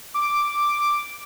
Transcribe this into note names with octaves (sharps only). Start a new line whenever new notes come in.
D6